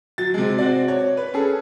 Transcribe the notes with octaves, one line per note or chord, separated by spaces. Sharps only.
F#3 A6
C3 G#3
C4 F#4 D5
C#5
B4
C#4 G#4 A4